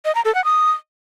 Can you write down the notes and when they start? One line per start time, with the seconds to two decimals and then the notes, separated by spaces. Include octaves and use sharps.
0.05 D#5
0.15 A#5
0.25 A4
0.35 F#5
0.45 D#6